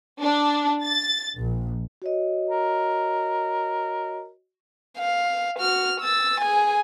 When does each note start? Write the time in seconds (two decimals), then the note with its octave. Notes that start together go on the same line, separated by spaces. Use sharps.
0.22 D4
0.84 A6
1.38 A#1
2.02 F#4 C#5 D#5
2.50 A#4
4.98 F5
5.59 F#4 F6
6.01 E6 A6
6.40 G#4 G#5